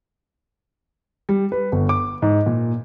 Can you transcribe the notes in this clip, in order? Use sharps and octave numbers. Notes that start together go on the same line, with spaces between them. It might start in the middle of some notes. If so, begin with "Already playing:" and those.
G3
B4
G1
D6
G#2
A#2